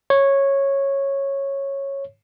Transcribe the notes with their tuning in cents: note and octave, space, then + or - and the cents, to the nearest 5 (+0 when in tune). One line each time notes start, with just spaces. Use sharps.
C#5 -10